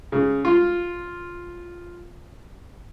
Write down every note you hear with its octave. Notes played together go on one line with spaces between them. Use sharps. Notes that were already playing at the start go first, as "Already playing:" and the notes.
C#3
F4